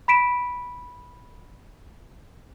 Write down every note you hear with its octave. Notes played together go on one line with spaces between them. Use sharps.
B5 B6 D7 E7